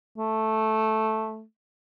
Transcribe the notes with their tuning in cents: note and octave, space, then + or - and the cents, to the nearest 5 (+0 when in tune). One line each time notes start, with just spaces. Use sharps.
A3 -5